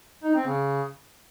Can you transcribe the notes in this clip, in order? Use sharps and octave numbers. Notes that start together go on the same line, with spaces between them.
D#4
C4
C#3